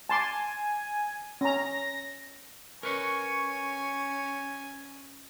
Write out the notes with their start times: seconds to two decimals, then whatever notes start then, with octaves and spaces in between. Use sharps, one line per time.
0.09 G#5 A5 C6 D6
1.41 C#4 A#5 A#6
2.83 C#4 A#4 B4 C#5 G#5 C#6